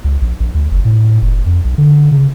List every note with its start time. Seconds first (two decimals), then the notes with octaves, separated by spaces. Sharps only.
0.04 C#2
0.21 A#1
0.40 A#1
0.54 D2
0.71 F#1
0.85 A2
1.22 F1
1.46 F2
1.64 B1
1.78 D3
2.11 C#3